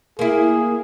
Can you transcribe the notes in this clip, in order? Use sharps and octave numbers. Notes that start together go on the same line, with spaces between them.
A#3 E4 G#4